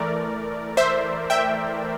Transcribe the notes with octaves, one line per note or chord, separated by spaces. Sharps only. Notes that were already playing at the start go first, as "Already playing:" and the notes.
Already playing: E3 A3 A#4 D5
C5 E5
E5 G5